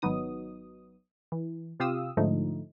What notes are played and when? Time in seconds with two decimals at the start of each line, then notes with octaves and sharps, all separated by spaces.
0.02 G#1 F#3 B3 D#4 D#6
1.32 E3
1.80 C3 F4 G4 F5 D#6 E6
2.17 G#2 D3 F3 A3 D#4